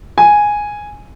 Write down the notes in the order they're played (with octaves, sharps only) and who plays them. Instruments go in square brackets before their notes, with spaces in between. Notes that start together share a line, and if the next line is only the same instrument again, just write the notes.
[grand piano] G#5